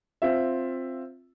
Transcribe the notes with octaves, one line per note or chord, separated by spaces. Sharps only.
C4 F4 E5